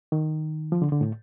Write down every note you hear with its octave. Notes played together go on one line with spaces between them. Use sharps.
D#3
F3
D3
D3
A2